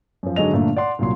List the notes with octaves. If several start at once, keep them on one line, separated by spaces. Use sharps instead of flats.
F#2 F3
G#1 D3 F#3 G#3 D#5 F7
G2 A#2 D3 A3 A#3
D5 F#5 C6
C2 A#2 F#3 C6